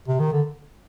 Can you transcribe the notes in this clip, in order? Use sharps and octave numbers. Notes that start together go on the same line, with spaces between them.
C3
D#3
D3